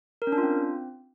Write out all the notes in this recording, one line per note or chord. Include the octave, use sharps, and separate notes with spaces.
A#4
C#4
D4
F4
C4